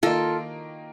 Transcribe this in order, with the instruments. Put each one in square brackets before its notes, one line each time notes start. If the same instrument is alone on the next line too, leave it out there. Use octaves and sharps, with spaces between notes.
[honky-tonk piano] D#3 A#3 D#4 [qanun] F4 A4